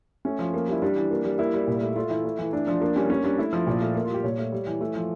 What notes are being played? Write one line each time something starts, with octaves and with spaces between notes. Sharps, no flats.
A3 C#4
F3
A#3
G3 E4
G3 D4
E3
A#3
G3
A#3 E4
G3
A#2
A3
A3 F4
E3 E4
A3
E3
A3 D4
F3 D4
A#3 D4
G3 C#4
A#3 C#4
G3 D4
A3 E4
F3
A#2
A3
A#3
F4
G3 G4
A#2 C#5
A3
G3
E3
A3
F3